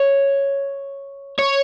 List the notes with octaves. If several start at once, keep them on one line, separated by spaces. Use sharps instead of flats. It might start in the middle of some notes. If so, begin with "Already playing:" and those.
Already playing: C#5
C#5